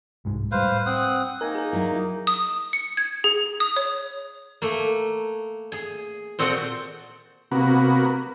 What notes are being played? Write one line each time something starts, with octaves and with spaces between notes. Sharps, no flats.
C2 G#2 G#3
A2 G3 B4 C5 F5
C4 F#5 D#6
A#3 D#4 A#4 G#5
G#4 A#4
F#3 E4
D#6
C#7
G#6
G#4
D#6
C#5
A3 A#3
G#4 G#5
A#2 C4 F#4 A4 D#5 G5
C3 A#3 B3 F#4